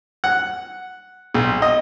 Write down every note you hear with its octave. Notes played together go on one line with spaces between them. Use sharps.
F#5
B1
D#5